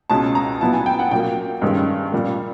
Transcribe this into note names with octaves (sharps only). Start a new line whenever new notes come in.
C#2 B2 G#3 C#4 A5
A#5
A#2 F#3 B3 E4 A5
G#5
G5
F#5
A#2 F#3 A#3 G5
G2 D#3 G#3 C#4
A#2 G3 A#3